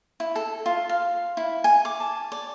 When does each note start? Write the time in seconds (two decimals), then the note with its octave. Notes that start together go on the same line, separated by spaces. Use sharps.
0.20 E4
0.36 A4
0.66 F4
0.89 F5
1.37 E4
1.64 G#5
1.85 D6
2.00 A5
2.32 D5